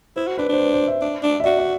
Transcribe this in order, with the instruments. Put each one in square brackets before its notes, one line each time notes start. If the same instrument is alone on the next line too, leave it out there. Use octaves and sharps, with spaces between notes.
[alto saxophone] E4 [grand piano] C5
[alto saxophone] F#4
[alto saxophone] D4 [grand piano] B4
[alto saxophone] D4 [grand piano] C5
[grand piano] B4
C5
E5
[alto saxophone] D4
D4
[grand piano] E5
[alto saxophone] F#4 [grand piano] D5
[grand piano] D5